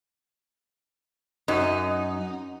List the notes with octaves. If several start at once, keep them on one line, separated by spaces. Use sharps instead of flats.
F#2 D#4